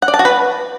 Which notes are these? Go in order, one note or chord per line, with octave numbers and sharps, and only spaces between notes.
F#5
D5
A5
F#4
B4